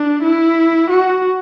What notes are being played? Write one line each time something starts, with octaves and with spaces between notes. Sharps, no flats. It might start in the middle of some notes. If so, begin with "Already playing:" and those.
Already playing: D4
E4
F#4